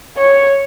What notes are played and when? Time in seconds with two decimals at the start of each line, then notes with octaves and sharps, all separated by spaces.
0.17 C#5